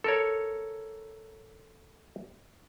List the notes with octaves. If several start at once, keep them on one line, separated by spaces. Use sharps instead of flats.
A4 A#4 C#5